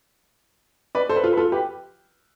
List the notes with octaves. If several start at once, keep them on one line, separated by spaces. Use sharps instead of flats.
B4 D5
A4 C5
B4
F4 A4
B4
F4 A4
G4 B4